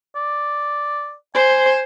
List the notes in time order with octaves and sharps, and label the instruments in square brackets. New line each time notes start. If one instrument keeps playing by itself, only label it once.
[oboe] D5
[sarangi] C5 [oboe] G#5